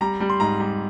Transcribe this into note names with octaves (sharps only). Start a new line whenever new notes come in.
G3 A#5
G3
C6
G#2 A#5
G3